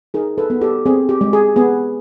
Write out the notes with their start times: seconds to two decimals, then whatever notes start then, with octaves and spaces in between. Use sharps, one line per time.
0.14 D#4 G#4 A#4
0.38 A4 B4
0.50 B3
0.61 G4 A4
0.86 C4 G#4
1.09 G4
1.21 G#3
1.33 G#4
1.56 B3 G#4